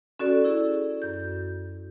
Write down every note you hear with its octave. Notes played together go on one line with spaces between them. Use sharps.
C#4 F#4 A4 D5
E4 G#4
F#2 G6